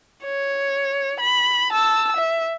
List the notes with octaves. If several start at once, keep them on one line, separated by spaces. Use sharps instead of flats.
C#5
B5
A5 E6
E5